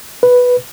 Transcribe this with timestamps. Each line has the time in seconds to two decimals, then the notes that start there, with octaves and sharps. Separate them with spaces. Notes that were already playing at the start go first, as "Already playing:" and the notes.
0.23 B4